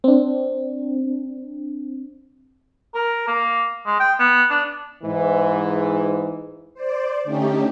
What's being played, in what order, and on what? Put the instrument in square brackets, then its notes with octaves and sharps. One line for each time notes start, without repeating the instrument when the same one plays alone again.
[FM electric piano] C4 D4
[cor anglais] A#4
A#3
G#3
G5
B3
D4
[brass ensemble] G#2 E3
[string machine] C5 D5
D3 A3 C#4 D#4 G4